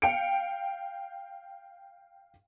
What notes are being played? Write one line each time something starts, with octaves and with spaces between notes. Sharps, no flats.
F5 G5 C#7 D7